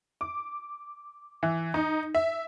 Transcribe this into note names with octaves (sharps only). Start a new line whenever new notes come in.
D6
E3
D#4
E5